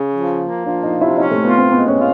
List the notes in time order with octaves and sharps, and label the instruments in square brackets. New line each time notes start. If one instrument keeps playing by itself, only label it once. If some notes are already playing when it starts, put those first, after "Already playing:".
Already playing: [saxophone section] C#3
F3
A#3
[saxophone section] F3 [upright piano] D4
[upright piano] D#4
[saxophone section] C3
[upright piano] E4
[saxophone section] C#4 [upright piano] D#4
[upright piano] A3
[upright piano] B3 [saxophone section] F4
[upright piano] C4
[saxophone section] G#3 [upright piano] B3
[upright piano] C#4
[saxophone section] F4